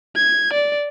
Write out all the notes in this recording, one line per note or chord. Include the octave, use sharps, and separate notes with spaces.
G#6
D5